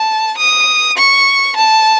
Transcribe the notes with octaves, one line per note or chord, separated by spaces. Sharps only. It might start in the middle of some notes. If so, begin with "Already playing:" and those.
Already playing: A5
D#6
C#6
A5